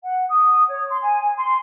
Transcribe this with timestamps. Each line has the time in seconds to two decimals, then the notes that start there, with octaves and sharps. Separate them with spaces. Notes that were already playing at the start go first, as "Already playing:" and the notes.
0.03 F#5
0.30 D#6
0.67 C#5
0.89 C6
1.01 G#5
1.36 C6